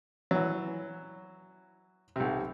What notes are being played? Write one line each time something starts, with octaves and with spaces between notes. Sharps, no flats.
E3 F#3
B1 C3